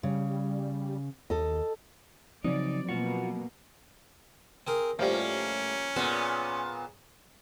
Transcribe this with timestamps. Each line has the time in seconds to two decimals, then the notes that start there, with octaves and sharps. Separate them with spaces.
0.03 C#3 G3
1.30 D#2 A4 D#5
2.44 C#3 F3 F#3 C4 D#4 D5
2.89 B2 A#3 F4 F#4
4.67 C4 G#4 A#4
4.99 A2 F3 G3 A#3 C#4
5.96 A#2 B3 G#4 C5 C#5